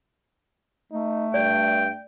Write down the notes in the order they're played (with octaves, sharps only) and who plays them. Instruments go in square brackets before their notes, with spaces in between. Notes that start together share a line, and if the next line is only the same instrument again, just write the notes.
[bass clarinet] A3 [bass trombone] D#4
[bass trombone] G2 [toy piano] D5 [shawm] G5